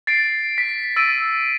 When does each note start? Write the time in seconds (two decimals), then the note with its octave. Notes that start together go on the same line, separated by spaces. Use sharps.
0.07 A6 C7 D7
0.58 B6
0.96 E6 A6 D7 D#7